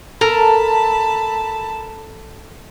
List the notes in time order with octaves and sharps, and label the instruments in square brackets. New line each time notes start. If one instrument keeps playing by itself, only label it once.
[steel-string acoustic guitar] A4 [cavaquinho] A#4 [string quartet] A5 B5